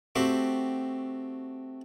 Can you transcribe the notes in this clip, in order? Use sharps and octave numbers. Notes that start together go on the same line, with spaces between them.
A3 C4 F#4 G4 C5